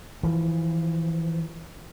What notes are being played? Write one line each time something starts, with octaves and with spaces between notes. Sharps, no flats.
E3 F3